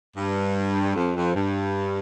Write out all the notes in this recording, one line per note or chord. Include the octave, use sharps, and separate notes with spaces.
G2
F2
F2
G2